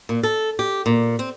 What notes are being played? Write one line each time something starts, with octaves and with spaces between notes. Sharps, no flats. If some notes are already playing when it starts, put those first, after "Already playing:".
A#2
A4
G4
A#2
C4